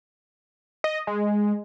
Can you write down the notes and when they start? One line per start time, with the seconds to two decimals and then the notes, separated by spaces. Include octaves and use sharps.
0.84 D#5
1.07 G#3